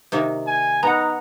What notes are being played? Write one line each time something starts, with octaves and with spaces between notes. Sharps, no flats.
C3 D#3 A#3
G#5
B3 D#4 F#5 A#5